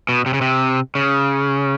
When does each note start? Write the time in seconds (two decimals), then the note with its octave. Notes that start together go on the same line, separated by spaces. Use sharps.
0.09 B2
0.26 C3
0.34 C#3
0.41 C3
0.95 C#3